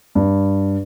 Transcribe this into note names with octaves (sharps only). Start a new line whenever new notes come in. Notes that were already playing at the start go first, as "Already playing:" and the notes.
G2